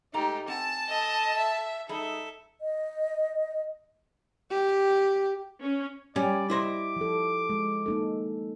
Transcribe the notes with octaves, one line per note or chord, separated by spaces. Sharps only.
G#2 A3 D#4 G4 A#5
C4 F#5 G#5 A5
A4 D#5
E5
G3 D#4 G#4 A4 E5
D#5
G4
C#4
G3 C#4 D5
E4 C5 D#5 D6
F3 A4
G#3
A#3 D#4 A4